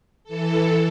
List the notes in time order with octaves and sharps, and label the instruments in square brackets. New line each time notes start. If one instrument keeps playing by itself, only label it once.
[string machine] E3 A4